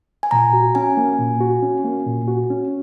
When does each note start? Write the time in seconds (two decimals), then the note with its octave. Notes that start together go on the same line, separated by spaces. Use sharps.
0.23 G#5
0.31 A#2 A#5
0.53 F#4
0.75 C#4 G#5
0.97 A#3
1.19 A#2
1.41 F#4
1.63 C#4
1.84 A#3
2.06 A#2
2.28 F#4
2.50 C#4